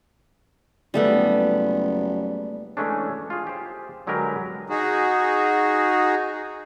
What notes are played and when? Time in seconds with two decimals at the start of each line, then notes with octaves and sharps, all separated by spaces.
0.94 F#1 G3 A3 B3
2.77 E3 G#3 A3 C#4 D4
3.30 F4 G#4
3.47 G4 G#4 C5
4.07 D3 F#3 G#3 G4 A#4 B4
4.70 D#4 F#4 G#4